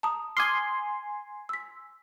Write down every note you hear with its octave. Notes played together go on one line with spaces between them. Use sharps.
A5 A#5 D#6
G#5 C6 D6 D#6 F6
E6 B6